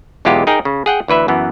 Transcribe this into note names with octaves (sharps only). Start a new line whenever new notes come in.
B1 E2 G#3 F4 G4 F#5
D#4 G#4 A#4 G5
C#3
G#4 F#5 G5
D2 E3 B4 E5
F#2 E3 B3